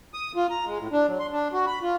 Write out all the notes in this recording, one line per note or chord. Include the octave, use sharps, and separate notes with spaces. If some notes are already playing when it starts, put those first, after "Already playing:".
D#6
F4
A#5
G#3
A2
D4
F#3
C6
D4
F#4
B5
F4